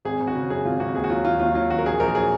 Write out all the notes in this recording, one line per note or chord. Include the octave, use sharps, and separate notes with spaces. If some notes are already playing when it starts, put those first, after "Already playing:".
G#1 G#4
G#1
F#4
C#3
F#2 G#4
G#1 F4
G#1 F#4
D#2 G#4
F#4
F#3 F4
D#2 F4
D#2 F4
F#3 F4
D#2 F#4
A#4
A#1 G#4
A#1 A#4
F#3 G#4